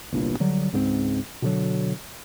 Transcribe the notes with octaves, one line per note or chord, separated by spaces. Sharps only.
G1 C2 G2 A#2
D3 F#3 G3
C#2 G#2 F#3 C4
B2 D3 F#3